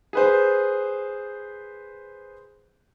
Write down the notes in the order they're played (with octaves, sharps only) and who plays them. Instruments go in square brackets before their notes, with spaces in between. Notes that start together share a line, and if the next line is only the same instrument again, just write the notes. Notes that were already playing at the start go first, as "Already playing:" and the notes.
[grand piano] G#4 B4 C5